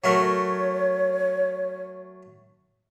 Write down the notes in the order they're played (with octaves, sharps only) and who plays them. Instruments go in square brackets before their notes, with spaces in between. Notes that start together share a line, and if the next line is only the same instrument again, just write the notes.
[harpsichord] F#3 A3 A#4 [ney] C#5